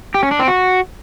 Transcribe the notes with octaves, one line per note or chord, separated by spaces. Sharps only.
G4
C#4
D4
C4
F#4